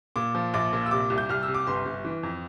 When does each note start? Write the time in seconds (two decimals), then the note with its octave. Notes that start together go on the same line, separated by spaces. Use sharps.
0.16 A#2 D6
0.35 F3
0.54 A#1 D6
0.73 A#2
0.86 E6
0.91 C3 D6
1.10 C2
1.18 G6
1.29 C2 F6
1.43 E6
1.48 C3
1.54 D6
1.67 G1 C6
1.86 G1
2.05 E3
2.23 F2